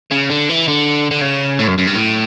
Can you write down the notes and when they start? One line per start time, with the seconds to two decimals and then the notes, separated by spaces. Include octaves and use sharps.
0.11 C#3
0.30 D3
0.49 E3
0.68 D3
1.11 D3
1.22 C#3
1.59 A2
1.68 F#2
1.78 F#2
1.87 G2
1.95 A2